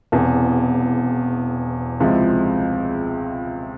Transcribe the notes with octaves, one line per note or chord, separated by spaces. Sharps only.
E1 E2 C3
C#2 C3 F3 G#3 E4